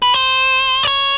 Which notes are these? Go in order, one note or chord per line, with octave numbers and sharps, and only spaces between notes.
B4
C5
D5
C#5